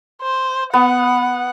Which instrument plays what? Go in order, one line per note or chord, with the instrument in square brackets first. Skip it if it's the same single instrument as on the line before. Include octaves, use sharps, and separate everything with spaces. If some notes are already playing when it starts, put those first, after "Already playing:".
[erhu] C5
[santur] B3 [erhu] F#5